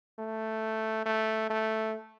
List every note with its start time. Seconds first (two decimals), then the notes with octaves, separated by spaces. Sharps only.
0.19 A3
1.06 A3
1.50 A3